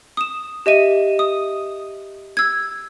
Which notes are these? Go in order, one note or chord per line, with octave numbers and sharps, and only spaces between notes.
D#6 E7
G4 D#5 E5 D#7
D#6
E6 G#6